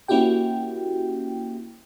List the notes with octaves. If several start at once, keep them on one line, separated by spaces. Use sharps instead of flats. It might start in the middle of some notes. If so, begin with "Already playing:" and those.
A#3 C#4 E4 F#4 G4 G5